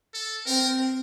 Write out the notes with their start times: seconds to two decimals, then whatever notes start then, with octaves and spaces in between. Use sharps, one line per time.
0.14 A4
0.46 C4 A#4